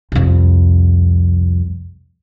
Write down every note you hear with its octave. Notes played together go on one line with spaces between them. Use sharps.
C2 F2